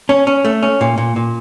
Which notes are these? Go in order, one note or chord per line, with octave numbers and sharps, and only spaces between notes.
C#4
C#4
A3
C#4
A#2
A#2
A#2